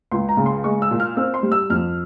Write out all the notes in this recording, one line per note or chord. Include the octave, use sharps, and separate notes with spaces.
C#2 C6
A#5
C#3
C6
G#3 C#6
E6
A#2
F6
C4 E6
C6
G3
E6
F2 F6